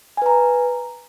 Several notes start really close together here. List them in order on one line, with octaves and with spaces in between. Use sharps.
G#5 B4 A#5